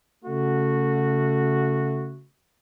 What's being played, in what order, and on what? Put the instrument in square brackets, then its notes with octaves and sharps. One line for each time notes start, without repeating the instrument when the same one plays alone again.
[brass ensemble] C#3 A3 F#4